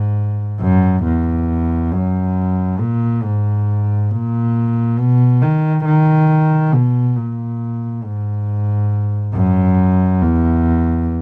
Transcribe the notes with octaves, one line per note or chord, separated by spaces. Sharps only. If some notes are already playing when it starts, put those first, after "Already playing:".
Already playing: G#2
F#2
E2
F#2
A#2
G#2
A#2
B2
D#3
D#3
B2
A#2
G#2
F#2
E2